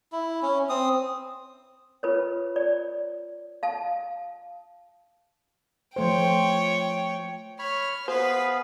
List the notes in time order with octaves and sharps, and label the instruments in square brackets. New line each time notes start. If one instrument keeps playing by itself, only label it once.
[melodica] E4
C#4
C4 D#6
[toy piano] F4 B4 C#5
D5
F5 A5
[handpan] F3 A3 C5 [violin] C#5 G5
[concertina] C#5 B5 C#6 [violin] F6
[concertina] B3 G#4 F5 [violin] B4 [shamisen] C5